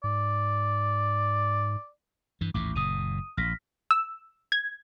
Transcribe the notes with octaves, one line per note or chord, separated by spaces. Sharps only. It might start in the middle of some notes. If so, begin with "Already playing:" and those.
G#2 D5
G2 E3
A1 D#2 G#2 D6
F#1 A#2 D#6 D#7
A#1 F6 A#6 B6
E6
G#6